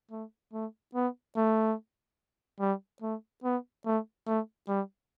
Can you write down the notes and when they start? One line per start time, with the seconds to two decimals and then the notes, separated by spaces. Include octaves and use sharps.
0.11 A3
0.53 A3
0.95 B3
1.37 A3
2.60 G3
3.02 A3
3.44 B3
3.86 A3
4.27 A3
4.68 G3